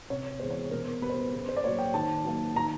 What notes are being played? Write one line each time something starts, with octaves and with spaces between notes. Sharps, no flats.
C3 C#5
E3 G#3 B3 C5
C#5
B2 A#4
G3 B3 B4
C5
B4
C#3 B4
C5
D5
F#3 A#3 C#5
G5
D#3 A5
F#3 A#3
D#3 A#5